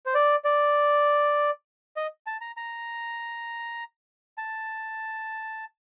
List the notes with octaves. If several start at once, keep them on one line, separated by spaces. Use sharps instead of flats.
C5
D5
D5
D#5
A5
A#5
A#5
A5